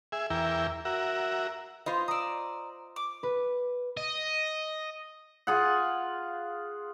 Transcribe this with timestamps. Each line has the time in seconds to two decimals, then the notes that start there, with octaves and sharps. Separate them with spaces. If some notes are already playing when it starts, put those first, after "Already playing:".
0.12 G#4 E5
0.30 E2 E4 A#4 G5
0.85 F#4 A#4 E5
1.86 B3 F4 C5 D#5
2.08 D5 A#5 D#6 E6
2.96 D6
3.23 B4
3.97 D#5
5.47 F4 G#4 F#5